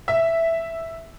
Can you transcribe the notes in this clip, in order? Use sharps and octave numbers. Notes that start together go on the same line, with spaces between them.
E5